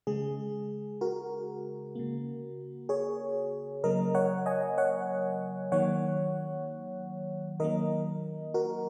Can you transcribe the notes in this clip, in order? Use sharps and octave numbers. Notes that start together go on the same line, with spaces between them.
C#3 G#3 G#4
F#4 A#4
C#3 A#3
G#4 C#5
C#3 F#3 A#3 A#4 D#5
C#5 F#5
D#5 G#5
C#5 F#5
D#3 F#3 A#3 C#5 F#5
D#3 F#3 A#3 A#4 D#5
F#4 A#4